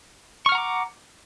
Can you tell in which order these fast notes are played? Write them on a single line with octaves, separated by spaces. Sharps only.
C#6 F6 F#5 A#5 D6